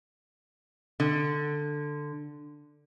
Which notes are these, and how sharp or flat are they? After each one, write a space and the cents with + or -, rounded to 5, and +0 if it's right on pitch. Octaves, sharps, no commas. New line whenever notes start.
D3 +10